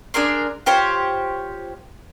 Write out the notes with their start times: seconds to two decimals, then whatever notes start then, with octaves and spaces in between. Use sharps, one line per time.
0.14 D4 G#4 A#4 C6
0.66 F4 G4 C5 C#5